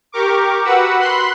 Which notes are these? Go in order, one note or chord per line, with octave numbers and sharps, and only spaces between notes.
G4 A#4 C#6 D6
F#4 B4 F#5 B5 E6
B5 C6 F#6 C7